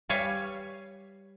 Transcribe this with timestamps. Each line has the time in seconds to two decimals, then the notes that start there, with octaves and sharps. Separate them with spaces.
0.09 G3 B4 C#5 F5 G#5